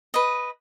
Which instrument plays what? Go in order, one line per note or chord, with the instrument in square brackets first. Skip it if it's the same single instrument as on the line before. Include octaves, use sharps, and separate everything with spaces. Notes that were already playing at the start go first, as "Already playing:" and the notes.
[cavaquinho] B4 D#5